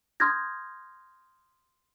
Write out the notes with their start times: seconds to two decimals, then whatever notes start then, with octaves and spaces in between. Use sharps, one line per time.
0.20 C6 D#6 F6 G6 G#6 A#6